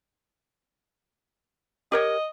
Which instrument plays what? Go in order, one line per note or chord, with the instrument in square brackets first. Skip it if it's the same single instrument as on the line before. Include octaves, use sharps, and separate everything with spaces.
[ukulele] G4 A#4 C#5 [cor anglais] D#5